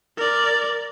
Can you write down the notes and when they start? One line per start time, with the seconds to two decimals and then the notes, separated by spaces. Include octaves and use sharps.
0.17 A#4 D5